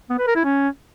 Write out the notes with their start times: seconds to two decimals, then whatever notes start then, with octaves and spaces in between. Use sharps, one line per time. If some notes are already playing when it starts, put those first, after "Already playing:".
0.10 B3
0.19 B4
0.27 A#4
0.36 E4
0.44 C#4